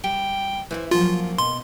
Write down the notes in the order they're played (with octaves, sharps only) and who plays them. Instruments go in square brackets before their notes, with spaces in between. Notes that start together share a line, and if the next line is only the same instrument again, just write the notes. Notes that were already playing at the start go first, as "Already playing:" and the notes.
[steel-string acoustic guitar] G3 [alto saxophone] G5
[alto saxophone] E3 [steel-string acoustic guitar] C5 C#5 E5
[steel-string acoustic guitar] F3 F#3 C#4 [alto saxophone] A#3 [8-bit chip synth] F4
[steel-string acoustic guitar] B2 [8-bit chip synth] C6